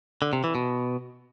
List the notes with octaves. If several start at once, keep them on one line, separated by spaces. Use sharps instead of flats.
D3
C3
E3
B2